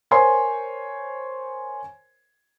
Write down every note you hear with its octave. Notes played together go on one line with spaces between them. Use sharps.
A#4 C5 C#5 G#5 C6